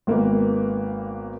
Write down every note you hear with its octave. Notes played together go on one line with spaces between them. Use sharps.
G#1 A#3 B3